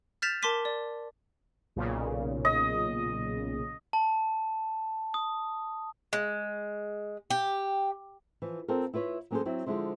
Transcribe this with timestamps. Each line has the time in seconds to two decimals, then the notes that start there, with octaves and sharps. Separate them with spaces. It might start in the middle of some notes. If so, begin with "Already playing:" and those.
0.22 F6 G6 A6 B6 E7 F7
0.42 A#4 A5 C6 D6 B6 D#7
0.65 D5
1.76 B1 A#2 C#3
2.45 D#5
3.93 A5
5.14 D#6
6.13 G#3
7.30 G4
8.42 E3 F3
8.68 C4 F4 A4 A#4
8.94 E4 F4 B4 C#5
9.31 F#3 A#3 C#4 G#4 A4 C5
9.45 F#3 C4 E4
9.66 D3 F3 G#3 D4 E4 C5